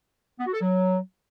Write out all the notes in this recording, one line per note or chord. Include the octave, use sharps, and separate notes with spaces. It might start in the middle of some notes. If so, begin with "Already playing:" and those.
B3
F#4
A4
F#3